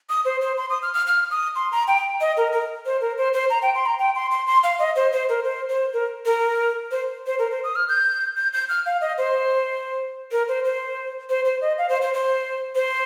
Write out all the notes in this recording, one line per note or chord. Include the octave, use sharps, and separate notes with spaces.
D#6
C5
C5
C6
D#6
F6
F6
F6
D#6
C6
A#5
G5
D#5
A#4
A#4
C5
A#4
C5
C5
A#5
G5
C6
A#5
G5
C6
C6
C6
F5
D#5
C5
C5
A#4
C5
C5
A#4
A#4
C5
C5
A#4
C5
D#6
F6
G6
G6
G6
F6
F5
D#5
C5
A#4
C5
C5
C5
C5
D#5
F5
C5
C5
C5
C5